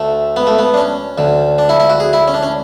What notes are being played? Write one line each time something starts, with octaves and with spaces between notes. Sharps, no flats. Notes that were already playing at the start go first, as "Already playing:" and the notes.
Already playing: D2 D3 A3
B3
A3
B3
D4
C#4
D2 D3
D4
E4
E4
F#4
G#4
E4
C#4
D4
C#4